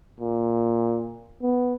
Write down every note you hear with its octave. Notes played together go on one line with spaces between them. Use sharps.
A#2
B3